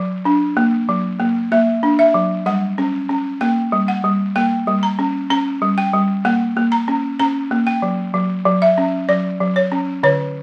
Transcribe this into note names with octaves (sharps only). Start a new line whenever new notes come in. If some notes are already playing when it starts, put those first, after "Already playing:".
Already playing: F#3
D4
A#3
F#3
A#3
A#3 E5
D4
E5
F#3
G3 F#5
C#4
C#4
A#3 G5
G3
F#5
G3
A#3 G5
G3
A#5
C#4
C#4 A#5
G3
G5
G3
A#3 F#5
A#3
A#5
C#4
C#4 A#5
A#3
G5
F#3
F#3
F#3
E5
C#4
F#3 D5
F#3
C#5
C#4
D3 C#5